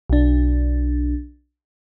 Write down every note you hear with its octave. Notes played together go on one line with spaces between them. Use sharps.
B1 D4